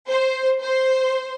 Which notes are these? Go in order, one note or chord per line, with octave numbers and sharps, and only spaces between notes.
C5
C5